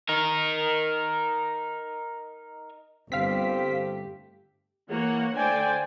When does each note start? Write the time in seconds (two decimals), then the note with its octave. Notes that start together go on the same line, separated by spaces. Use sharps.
0.09 D#4 A#4
3.12 G1 A3 C4 G4 F5 B6
4.89 E3 A#3 C#5 F#5
5.34 D3 A3 C5 D5 G5 G#5